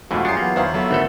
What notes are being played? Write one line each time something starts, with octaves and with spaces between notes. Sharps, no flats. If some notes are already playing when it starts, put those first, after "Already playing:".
F2 G#2 B2 E3 A3 F4 F#4
F#2 D4 F4 G4 G#4 C7 C#7
E3 F#3 A#3 B3
E2 D3 D#3 F4 C5 C#5 F5 B5
F#3 B3 A4 E5
G#1 D3 A3 A4